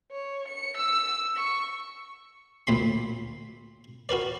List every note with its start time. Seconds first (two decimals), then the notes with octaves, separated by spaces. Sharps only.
0.11 C#5
0.48 C#7
0.77 E6
1.36 C#6
2.67 D2 A#2 B5 C6
4.09 F#4 A#4 B4 D5